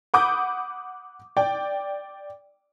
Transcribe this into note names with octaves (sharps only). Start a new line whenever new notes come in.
F#5 B5 D6 D#6 G6
D5 G5